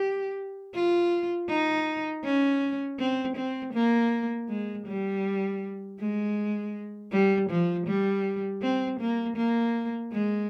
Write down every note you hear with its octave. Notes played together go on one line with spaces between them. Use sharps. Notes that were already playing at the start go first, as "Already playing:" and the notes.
Already playing: G4
F4
D#4
C#4
C4
C4
A#3
G#3
G3
G#3
G3
F3
G3
C4
A#3
A#3
G#3